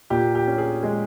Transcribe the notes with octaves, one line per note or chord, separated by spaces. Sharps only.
A#2 G4
G4
C#4
G#4
G#3 G#4